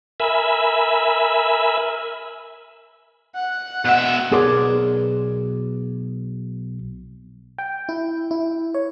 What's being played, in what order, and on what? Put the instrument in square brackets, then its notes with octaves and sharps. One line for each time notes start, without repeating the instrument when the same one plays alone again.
[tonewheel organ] A#4 E5 G#5 B5
[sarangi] F#5
[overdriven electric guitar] B2 E5
[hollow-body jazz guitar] B1 B2 G#4 A#4 D5 C6
[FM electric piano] G5
E4
E4
C#5